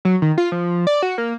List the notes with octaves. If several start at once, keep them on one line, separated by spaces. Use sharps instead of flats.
F#3
D#3
F4
F3
D5
F#4
A#3